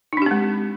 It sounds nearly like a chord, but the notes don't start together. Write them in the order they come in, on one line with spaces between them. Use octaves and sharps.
D#4 D4 G4 C4 G#3